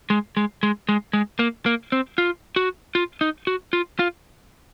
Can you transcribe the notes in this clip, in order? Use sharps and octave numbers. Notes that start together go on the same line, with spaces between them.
G#3
G#3
G#3
G#3
G#3
A#3
A#3
C4
F4
F#4
F4
D#4
F#4
F4
F4